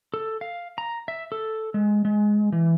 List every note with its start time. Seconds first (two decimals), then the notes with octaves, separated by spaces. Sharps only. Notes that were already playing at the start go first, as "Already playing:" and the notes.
0.14 A4
0.41 F5
0.78 A#5
1.08 E5
1.32 A4
1.74 G#3
2.05 G#3
2.52 E3